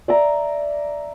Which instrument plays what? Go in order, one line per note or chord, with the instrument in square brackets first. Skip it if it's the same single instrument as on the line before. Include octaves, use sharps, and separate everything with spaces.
[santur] D5 E5 A#5